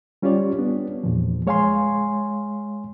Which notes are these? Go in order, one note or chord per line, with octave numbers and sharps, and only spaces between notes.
G3 C#4 F4 G4 C#5 D5
B3 D4
E2 A#2 F3
G#3 C#5 F5 G#5 C6